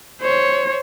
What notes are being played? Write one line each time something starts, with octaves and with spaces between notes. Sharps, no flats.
C5 C#5